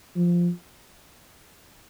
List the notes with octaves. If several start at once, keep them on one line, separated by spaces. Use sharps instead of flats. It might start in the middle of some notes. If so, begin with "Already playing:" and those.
F3